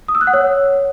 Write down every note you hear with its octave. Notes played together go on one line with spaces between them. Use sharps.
D#6
E6
F#6
F#5
C#5